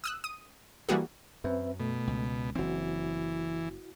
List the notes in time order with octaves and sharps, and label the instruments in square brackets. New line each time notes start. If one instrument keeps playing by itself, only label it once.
[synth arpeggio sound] D#6 E6 F#6
D#6 D#7
E3 G3 A#3 F#4 G#4
[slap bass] F#2 [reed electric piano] C4 B4 E5
[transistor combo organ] B2 [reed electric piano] A3
[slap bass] C#2
[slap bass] F#1 C4 [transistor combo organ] E3 [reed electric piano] E4 F#4